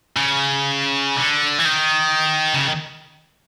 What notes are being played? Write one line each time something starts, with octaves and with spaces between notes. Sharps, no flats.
C#3
D3
E3
D#3
C#3